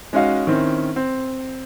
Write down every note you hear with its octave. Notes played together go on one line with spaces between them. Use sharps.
G#3 C#4 D#4 F#4 D#5 F5
D#3 C4 C#4 E4
C4